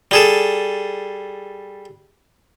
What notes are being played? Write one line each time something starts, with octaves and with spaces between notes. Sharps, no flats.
G3 G#4 A4